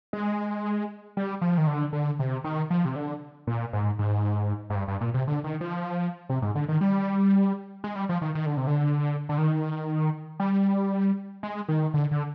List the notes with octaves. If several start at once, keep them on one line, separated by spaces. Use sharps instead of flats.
G#3
G3
F3
D#3
D3
D3
C3
D#3
F3
C3
D3
A#2
G#2
G#2
G#2
G2
G2
A#2
C3
D3
D#3
F3
C3
G#2
D3
D#3
G3
G#3
G3
F3
D#3
D#3
D3
C3
D3
D3
D#3
G3
G#3
D#3
D3
D3